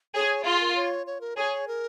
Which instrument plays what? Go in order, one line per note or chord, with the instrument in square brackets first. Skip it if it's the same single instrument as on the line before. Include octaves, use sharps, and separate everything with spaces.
[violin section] G#4 [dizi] C#5
[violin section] F4 [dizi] G#4
[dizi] A#4
C#5
C#5
A#4
[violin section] G#4 [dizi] C#5
[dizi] A#4